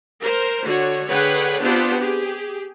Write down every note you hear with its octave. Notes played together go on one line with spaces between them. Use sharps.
A#4 C5
D3 F#4 C#5
D3 G#4 B4 C#5 F#5 G5
B3 C4 D4 F4 G4 C5
G4 G#4